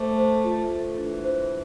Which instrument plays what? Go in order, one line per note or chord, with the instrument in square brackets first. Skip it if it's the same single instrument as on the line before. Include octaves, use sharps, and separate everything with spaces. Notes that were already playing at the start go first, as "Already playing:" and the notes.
Already playing: [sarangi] A3 [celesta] C5 D6
[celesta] C5
F4
A4
[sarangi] E3 [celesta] D4
[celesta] C5